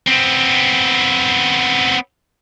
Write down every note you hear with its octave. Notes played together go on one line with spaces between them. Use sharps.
B3 C4